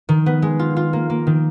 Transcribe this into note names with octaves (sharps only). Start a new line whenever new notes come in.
D#3
B3
G#3
F4
F4
A#3
A#3
D#3